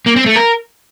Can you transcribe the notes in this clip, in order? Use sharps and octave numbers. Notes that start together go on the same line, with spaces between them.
A#3
C4
A3
A#4